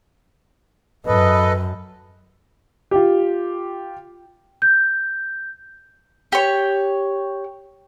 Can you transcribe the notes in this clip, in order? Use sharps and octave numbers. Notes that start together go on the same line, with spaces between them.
F#2 A4 B4 D#5
F4 G4
G6
G4 C#5